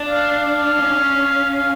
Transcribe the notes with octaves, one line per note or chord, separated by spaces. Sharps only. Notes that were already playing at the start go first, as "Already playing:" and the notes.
Already playing: D4
F5
C#4
F5